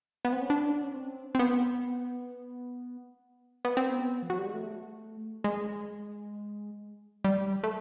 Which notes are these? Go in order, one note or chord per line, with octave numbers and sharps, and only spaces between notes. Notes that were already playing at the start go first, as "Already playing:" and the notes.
B3
C4
C#4
D4
C#4
C4
C4
B3
B3
C4
B3
F3
F#3
G3
G#3
A3
G#3
G3
A3